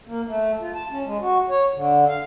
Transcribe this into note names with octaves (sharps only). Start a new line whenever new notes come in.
A#3
A3
F4
A5
C#4
G#3
F#4
C#5
D3
F5